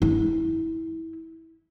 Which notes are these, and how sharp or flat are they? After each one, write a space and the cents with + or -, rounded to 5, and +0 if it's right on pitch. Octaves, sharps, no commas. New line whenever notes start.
E4 -20